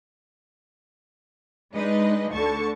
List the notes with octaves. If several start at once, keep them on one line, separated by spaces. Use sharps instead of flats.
G#3 D4 D#4 B4 D#5
D2 D3 A5 C#6